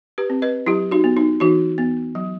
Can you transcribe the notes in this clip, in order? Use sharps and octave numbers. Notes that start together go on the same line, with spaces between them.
G4 B4
C4
B4 D#5
F#3 E4 G4
D#4 F#4
B3
D#4
E3 D#4 F#4
B3
F#3